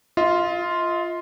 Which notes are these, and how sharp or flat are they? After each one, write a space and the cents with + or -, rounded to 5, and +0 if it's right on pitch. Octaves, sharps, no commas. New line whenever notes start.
F4 -5 D#5 +40